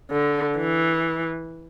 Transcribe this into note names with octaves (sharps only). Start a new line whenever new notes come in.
D3
E3